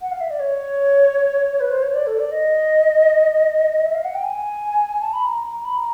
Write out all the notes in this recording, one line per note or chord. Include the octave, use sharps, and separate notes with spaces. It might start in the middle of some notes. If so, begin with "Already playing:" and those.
F#5
F5
E5
D5
C#5
B4
C5
C#5
D5
A4
D5
D#5
E5
F5
F#5
G5
G#5
A5
B5
A#5
A#5
B5
A#5